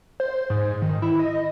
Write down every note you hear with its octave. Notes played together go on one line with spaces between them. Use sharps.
C5
G#2
D#3
E4
D#5